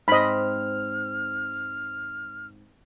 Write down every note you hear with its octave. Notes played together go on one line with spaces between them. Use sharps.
G#2 C4 D#5 B5 F6